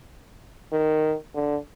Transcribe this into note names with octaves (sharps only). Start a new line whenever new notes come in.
D#3
D3